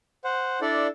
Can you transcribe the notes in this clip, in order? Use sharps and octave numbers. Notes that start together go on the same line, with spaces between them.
C5 F#5
D4 E4 A4 D5